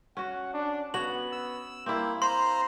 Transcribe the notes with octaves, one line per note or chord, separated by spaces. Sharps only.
C#4 F#4 F#5
D4
B3 F#4 C#5 F#7
E6
G3 A#3 C4 E4
C5 F5 A#5 C6